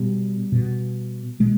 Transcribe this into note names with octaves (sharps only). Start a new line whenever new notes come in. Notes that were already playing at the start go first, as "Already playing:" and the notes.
Already playing: B2 G3
B2
B2 G#3